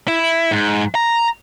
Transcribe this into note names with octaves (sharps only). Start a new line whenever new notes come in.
E4
G#2
A#5